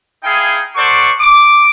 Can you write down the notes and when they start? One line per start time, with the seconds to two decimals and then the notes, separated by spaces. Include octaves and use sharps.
0.24 D#4 E4 G#4 F5 G5 G#5
0.76 F#4 A4 C5 D5 C#6
1.19 D6